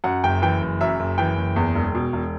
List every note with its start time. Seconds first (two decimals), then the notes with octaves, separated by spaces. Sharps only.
0.04 F#2 F#5
0.24 F#1 G5
0.42 E3 G5
0.61 F#1
0.81 F#2 E5
0.99 F#1
1.18 E3 G5
1.37 F#1
1.56 E2
1.75 E1
1.95 B2
2.13 E1